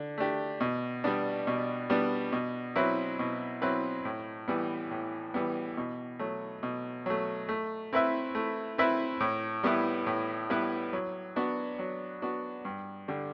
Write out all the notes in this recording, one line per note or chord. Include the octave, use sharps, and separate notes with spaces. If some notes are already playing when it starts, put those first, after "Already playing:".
Already playing: D3 D4
A3 D4 G4
B2
G3 B3 D4
B2
G3 B3 D4
B2
F#3 C4 E4 B4
B2
F#3 C4 E4 B4
A2
E3 G3 B3
A2
E3 G3 B3
B2
F#3 A3
B2
F#3 A3
A3
C4 E4 B4 E5
A3
C4 E4 B4 E5
A2
G3 B3 E4 B4
A2
G3 B3 E4 B4
F#3
B3 D4 F#4
F#3
B3 D4 F#4
G2
D3 G3